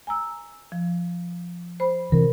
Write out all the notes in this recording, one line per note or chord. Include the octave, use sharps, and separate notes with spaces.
G#5 A#5 E6
F3
C5 B5
C3 E3 A#4